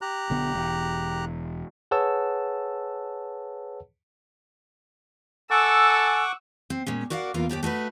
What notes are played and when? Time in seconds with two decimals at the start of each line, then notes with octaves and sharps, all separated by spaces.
0.01 G4 A#5 F#6
0.30 B1 D3 B3
0.55 E1
1.91 G#4 B4 C#5 F#5 A5 E6
5.51 A4 F#5 G#5 C#6 D6 E6
6.70 C4
6.87 A#2 G#3 C#4
7.10 F#4 A#4 D5 F5 F#5
7.34 E2 A#3 F4 A#4
7.49 D#2 G#2 G4 D5
7.63 A3 D#4 F#4 B4